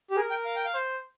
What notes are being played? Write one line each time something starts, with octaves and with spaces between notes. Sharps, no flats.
G4
G#4 A#4
G5
F5
G5
F5
C5